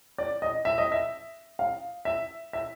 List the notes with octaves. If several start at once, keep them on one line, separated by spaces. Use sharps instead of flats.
D5
D#5
E5
D#5
E5
F5
E5
E5